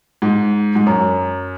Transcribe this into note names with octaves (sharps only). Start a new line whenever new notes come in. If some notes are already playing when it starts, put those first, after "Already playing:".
G#2
G#2
F#2